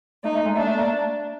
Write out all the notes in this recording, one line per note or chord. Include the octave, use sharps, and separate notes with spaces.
A3 D#4
A3
G#3
A3 D4
A3
A#3